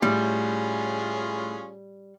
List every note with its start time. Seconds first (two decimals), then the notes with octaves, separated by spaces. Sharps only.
0.02 A2 G3 C#4 F4 G#4